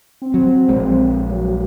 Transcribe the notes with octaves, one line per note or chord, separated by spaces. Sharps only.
C4
F#3
A#1 G#3
F#3